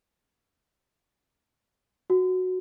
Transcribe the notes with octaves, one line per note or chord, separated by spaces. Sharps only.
F#4